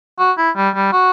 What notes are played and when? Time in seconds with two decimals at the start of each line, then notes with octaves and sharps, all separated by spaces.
0.19 F#4
0.38 E4
0.57 G3
0.75 G3
0.93 F#4